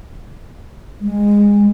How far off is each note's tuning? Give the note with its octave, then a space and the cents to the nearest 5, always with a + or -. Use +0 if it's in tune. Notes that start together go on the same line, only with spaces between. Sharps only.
G#3 -20